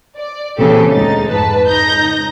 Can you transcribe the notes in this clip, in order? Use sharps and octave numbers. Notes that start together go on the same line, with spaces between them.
D5
A#2 C#3 E3 C4 G4 A4
D2 G#3 D#4 A6
F2 G#2 B4 A5
C#2 D#4 A#5 G6 A#6